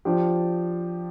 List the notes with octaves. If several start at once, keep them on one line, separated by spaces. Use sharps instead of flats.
F3 D4 G4